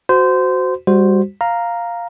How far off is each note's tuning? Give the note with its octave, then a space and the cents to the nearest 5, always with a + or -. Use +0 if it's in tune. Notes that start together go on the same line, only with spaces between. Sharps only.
F#4 +0 C5 -20
G3 +30 F#4 +0 C5 +0
F5 +0 A#5 +0